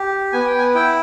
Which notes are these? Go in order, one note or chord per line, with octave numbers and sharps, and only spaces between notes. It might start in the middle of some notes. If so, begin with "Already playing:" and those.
Already playing: G4
B3 G#5
G5
G#5
E4 G5